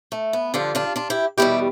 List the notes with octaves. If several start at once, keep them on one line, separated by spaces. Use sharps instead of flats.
A3
B3
G2 D3 F3 D4 F4
D4 F4
D4 F4
E4 G4
E2 B2 G3 E4 G4